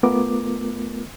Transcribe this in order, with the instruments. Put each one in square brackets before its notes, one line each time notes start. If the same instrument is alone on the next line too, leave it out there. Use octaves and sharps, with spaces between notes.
[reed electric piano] A3 B3 F4 A#4 D6